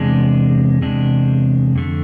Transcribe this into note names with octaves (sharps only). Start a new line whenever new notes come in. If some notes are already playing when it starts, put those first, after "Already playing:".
Already playing: E2 C3 G#3 D4
E2 C3 G#3 D4
F2 D3 A3